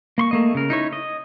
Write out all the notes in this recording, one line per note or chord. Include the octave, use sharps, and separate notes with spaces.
A#3 C6 C#6
A3 A#3 D#5
C#3 A#4
D#4 E4 C#5
D#5